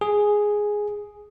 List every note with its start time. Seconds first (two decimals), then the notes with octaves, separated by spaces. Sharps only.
0.01 G#4